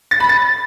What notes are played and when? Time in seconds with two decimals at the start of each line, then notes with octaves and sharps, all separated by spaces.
0.11 A6
0.20 B5
0.29 A6